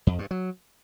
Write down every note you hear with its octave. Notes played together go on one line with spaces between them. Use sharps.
F2
G2
F#3